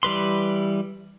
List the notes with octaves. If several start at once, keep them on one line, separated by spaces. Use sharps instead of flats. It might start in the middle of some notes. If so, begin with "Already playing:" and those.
E3 G3 B4 C6